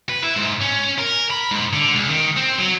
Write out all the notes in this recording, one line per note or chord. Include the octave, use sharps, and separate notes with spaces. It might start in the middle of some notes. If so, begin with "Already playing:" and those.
B4
E4
G#2
C#4
A#4
B5
G#2
D3
C#2
D#3
C4
F#3